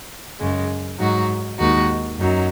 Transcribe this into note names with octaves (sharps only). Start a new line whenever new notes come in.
F#2 C#3 G#3
G#2 F#3 D#4 F#4
D#2 D#3 G#3 D#4 F#4
F#2 F#3 D#4